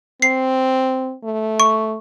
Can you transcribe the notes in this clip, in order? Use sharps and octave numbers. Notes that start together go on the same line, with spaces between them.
C4 C7
A3
C#6